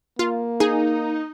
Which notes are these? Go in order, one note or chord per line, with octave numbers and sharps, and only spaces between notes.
A#3 F4
D#4 G#4